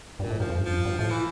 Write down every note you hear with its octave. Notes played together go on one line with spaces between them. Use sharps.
G2 A#2
A2
G2 F3
F2
G2
F3
F2
G2
A2 F3
E3